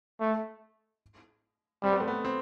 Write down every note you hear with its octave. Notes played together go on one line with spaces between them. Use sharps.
A3
G3 C4
B3
A3
B3
C4